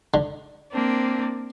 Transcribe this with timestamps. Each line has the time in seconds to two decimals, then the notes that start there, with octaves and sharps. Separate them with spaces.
0.14 D3
0.72 A#3 C4 D4